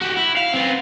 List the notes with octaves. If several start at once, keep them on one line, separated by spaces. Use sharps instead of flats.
F#4 G4
E4
F5
B3 C4